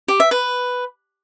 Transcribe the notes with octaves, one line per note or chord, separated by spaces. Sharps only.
G4
E5
B4